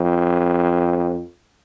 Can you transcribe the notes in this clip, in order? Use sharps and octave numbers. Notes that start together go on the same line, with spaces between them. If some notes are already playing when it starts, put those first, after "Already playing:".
Already playing: F2